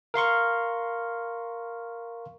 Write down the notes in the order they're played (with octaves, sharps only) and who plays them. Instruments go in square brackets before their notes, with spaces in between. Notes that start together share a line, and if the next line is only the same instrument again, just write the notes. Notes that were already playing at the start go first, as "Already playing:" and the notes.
[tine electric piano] A#4 F5 C6 C#6